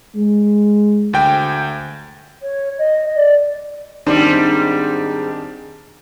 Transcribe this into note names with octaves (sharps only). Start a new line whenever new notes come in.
G#3
D2 G5
C#5
D#5
D5
G#2 D#3 G3 C4 D4